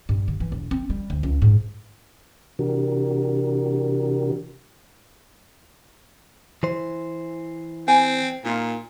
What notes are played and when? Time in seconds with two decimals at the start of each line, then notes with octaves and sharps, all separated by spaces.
0.09 G2
0.28 D3
0.40 E3
0.52 E1
0.71 C4
0.90 G3
1.10 D2
1.23 C#2
1.42 G#2
2.59 C3 E3 D4 F#4 G4 A#4
6.63 E3 C5
7.88 C4 G#5
8.45 A#2 D#4 F4